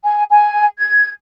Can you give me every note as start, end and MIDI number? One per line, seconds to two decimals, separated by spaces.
0.04 0.23 80
0.29 0.65 80
0.78 1.08 92